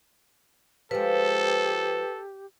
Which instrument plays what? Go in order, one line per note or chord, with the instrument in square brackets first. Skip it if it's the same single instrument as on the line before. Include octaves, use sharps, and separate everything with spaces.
[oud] F3 G#3 [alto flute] G4 [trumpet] A4 [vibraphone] B4